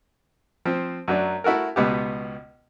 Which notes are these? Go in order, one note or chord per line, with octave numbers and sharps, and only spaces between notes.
F3 C4
F#2 F#3 D4
A3 E4 F#4 A4 A#4
C#2 B2 B3 G4